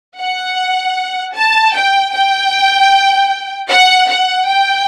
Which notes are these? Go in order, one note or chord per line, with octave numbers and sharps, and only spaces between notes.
F#5
A5
G5
G5
F#5
F#5
G5